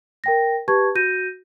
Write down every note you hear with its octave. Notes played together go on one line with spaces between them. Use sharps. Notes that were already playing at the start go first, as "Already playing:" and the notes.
A#4 G5 A#6
G4 B4 A5 C#6 G#6
F#4 G6 A#6 D#7